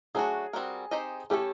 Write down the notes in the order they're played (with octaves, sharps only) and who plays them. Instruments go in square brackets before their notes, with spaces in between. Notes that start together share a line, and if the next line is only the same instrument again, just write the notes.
[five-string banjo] F#3 A3 D4 F#4 [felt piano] G#4
[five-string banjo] G3 C4 D#4 F#4 A#4
C4 D#4 G4 C5 D#5
[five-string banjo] A3 C#4 E4 A4 [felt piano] G4